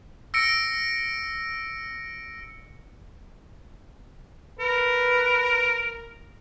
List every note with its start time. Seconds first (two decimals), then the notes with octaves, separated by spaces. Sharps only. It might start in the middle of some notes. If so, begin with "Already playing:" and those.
0.34 E6 A#6 C#7 D7
4.59 A#4 B4